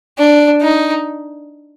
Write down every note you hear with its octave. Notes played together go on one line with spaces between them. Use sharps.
D4
D#4